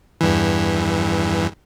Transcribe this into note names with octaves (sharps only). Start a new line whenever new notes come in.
E2 G2 E3